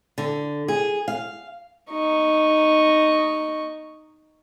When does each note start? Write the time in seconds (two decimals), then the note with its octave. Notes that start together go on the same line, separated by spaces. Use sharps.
0.18 D3
0.68 G#4
1.08 F5
1.91 D#4 C#6